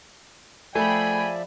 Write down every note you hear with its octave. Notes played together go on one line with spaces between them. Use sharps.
F3 A3 G#4 D5 E5 G5 G#5 B5